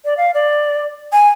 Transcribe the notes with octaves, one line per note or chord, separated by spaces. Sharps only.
D5
F5
D5
G#5